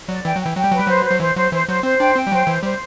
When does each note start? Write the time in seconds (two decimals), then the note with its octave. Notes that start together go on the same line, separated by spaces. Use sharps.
0.09 F#3 D5
0.25 E3 G5
0.36 F#3
0.41 G5
0.46 E3
0.56 F#3 G5
0.64 G3
0.72 F#3 B4
0.79 G3
0.86 F#3 C5
1.04 C5
1.10 F#3
1.20 E3 C5
1.36 F#3 C5
1.52 E3 C5
1.68 F#3 C5
1.83 C4 C5
2.00 D4 G5
2.15 C4 G5
2.27 G3
2.31 F#3 C5
2.47 E3 C5
2.63 G3 C5